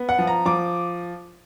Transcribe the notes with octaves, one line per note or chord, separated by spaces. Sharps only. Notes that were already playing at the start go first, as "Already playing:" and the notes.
Already playing: B3
F#5
F3
A#5
F3 D6